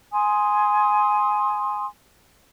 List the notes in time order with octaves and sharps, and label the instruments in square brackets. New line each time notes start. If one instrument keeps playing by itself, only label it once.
[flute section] G#5 C6 D#6